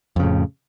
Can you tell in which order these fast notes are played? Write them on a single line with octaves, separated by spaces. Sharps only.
F2 C#3 A2